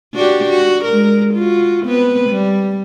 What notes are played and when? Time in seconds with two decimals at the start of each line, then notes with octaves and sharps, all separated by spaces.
0.14 D4 F#4 G4
0.50 F#4
0.84 G#3 A#4
1.34 F4 F#4
1.86 B3 C4 B4
2.29 G3